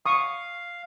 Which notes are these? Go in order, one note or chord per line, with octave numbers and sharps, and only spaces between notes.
F5 C#6 D#6